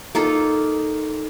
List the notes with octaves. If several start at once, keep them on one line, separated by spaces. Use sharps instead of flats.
A#3 D#4 F4 A4